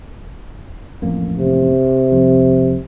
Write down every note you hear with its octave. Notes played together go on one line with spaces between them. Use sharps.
A1 F2 A#3
C3
C2 F2